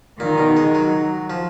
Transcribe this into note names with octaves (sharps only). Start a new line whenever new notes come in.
A#2 D#3
B2
G#3
F#3
F3